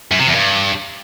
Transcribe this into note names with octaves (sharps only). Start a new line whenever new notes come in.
F#2
C3
E2
G2